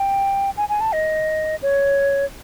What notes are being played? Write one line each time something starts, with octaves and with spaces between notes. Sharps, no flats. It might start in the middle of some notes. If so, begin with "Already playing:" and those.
Already playing: G5
G#5
G#5
A5
D#5
C#5